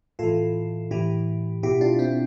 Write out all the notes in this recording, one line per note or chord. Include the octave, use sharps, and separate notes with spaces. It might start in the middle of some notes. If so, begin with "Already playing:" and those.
A2 E3 F4 A4
A2 E3 E4 G4
B2 E4 G4
D4 F4
C4 E4